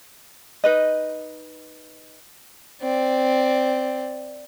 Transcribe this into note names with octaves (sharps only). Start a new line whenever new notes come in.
D#4 B4 D#5
C4 D5